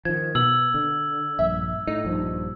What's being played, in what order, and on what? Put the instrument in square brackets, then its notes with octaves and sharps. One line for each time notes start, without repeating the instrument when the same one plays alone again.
[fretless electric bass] D#3 F3 [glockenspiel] G#6
[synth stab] B2 [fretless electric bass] B3 [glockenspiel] E6 F#7
[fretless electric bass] D3
[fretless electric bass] A#1 [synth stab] G2 E5
[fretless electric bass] A2 [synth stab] D#4
[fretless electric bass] A#1 G2 F3